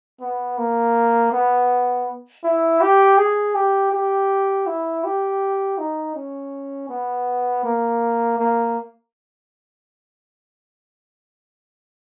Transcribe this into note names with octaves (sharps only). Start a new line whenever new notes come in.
B3
A#3
B3
E4
G4
G#4
G4
G4
E4
G4
D#4
C#4
B3
A#3
A#3